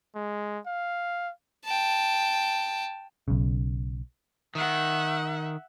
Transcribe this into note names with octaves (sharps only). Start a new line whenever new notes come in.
G#3
F5
G5 A5
B1 C#3
D#3 E5 F#5